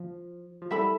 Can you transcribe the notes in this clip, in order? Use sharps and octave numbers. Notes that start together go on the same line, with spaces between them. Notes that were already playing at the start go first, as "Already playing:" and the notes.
Already playing: F3
F3
G3 E4 A4 E5 B5